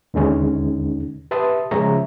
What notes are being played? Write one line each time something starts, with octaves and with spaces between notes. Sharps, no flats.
D#2 D3 G#3 C#4 D#4
G4 B4 E5 A5 C6 D#6
C#3 F3 G#3 C#5 E5 A#5